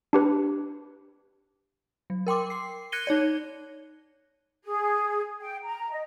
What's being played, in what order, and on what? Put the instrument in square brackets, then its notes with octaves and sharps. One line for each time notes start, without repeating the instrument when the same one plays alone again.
[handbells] D4 G4 B4
[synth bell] F#3
A#4 G5 C6 D6
C7
F#6 G#6 A#6 C#7 D#7 G7
D#4 C#5 D5
[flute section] G#4
G5
A#5
D#5